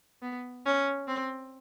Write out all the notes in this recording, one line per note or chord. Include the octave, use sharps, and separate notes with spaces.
B3
C#4
C4